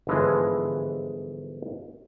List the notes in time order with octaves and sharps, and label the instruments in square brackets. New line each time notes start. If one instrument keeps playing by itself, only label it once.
[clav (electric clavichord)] G1 G#2 E3 F3 G#3 F#5